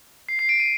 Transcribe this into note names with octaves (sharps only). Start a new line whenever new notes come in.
C7
C7
D7
D#7